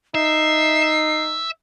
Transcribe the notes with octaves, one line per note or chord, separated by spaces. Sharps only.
D#4 E5 C7